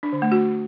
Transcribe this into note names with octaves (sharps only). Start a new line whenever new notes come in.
D4
D3
A3
F#4